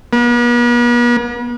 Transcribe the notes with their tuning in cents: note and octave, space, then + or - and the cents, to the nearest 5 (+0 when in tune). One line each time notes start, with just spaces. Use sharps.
B3 -45